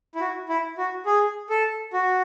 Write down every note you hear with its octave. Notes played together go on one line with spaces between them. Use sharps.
E4
F#4
E4
F#4
G#4
A4
F#4